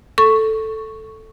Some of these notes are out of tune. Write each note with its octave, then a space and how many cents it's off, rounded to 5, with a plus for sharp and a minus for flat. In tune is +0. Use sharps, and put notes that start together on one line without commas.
A4 +0 C#6 +0